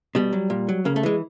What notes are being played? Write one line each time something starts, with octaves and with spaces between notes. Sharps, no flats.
B2 G3
F#3
A#2
F#3
C#3 A#3
A3
E3 G#3